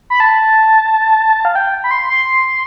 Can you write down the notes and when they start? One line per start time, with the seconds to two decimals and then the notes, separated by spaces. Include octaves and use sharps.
0.10 B5
0.20 A5
1.45 F5
1.55 G5
1.84 B5
1.91 C6
2.09 C6